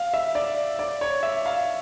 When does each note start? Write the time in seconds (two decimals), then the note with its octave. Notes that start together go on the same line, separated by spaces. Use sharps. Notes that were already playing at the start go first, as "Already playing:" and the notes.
Already playing: F5
0.14 E5
0.35 D5
0.79 D5
1.01 C#5
1.23 E5
1.46 F5